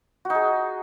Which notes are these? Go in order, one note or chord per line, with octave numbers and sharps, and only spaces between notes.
D#4 F#4 G#4